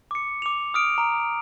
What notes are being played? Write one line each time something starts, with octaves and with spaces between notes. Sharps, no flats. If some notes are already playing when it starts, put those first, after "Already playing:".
D6 C#7
D6 F7
D#6 F6 D7
A#5